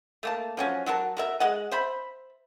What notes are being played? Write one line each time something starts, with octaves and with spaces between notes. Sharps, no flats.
A3 A#3 A5
F3 F#3 C#4
F#3 F#4 A#4 A5
F#4 A#4 E5
G#3 D#5 F#5
C5 E5 B5